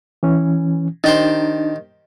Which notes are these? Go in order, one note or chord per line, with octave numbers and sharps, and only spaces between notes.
E3 C#4
D#3 D4 D#4 G4 C5 A6